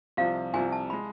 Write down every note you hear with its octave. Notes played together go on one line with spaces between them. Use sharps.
C2 C3 F3 F5
C2 C3 F3 G#5
A5
G#3 B5